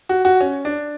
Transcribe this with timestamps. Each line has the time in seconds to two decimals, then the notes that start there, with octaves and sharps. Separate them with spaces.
0.09 F#4
0.25 F#4
0.41 C#4
0.65 D4